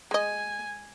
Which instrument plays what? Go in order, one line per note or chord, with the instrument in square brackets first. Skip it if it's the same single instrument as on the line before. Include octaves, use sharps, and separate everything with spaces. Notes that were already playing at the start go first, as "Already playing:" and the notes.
[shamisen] G#3 D#5 [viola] G#5